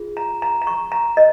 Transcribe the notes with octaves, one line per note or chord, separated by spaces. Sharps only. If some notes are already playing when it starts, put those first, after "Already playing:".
Already playing: F4 G#4
A#5
A#5
A#5
C#6
A#5
D#5